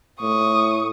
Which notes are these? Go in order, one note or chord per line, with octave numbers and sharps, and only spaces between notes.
A2 C#6 D#6